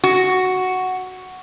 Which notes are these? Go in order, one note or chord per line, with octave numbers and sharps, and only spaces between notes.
F#4